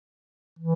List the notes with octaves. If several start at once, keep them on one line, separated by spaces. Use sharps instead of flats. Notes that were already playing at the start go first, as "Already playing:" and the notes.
E3